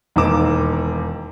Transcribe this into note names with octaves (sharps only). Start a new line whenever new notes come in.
E1 D#2 D#4 A#5 D6 E7